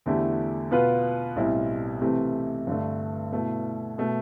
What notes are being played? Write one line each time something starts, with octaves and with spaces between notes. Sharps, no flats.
E2 D3 A3 E4 G4
B2 B3 F4 B4
B1 A2 G3 C4 E4
C3 E3 A3 C4 G4
G2 D3 A3
B2 A3 E4
B2 A3